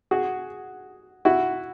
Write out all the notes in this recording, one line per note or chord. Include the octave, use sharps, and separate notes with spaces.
F#4 G#4
E4 F#4